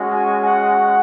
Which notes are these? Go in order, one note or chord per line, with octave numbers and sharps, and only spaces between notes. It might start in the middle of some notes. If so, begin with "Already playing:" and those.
Already playing: G#3 C#4 F#4
G#5
F#5